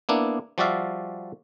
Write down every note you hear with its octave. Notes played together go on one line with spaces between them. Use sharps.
A#3 B3 D4 E4
F3 G3 F#4 D5 E5 F5